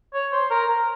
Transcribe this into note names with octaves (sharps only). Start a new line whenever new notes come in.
C#5
C5
A#4